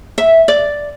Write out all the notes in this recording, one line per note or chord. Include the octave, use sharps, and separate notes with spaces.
E5
D5